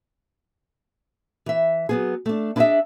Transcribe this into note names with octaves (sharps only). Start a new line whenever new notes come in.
E3 E5
F#3 B3 G#4
A3 D4
D4 E4 G#4 B4 D#5 E5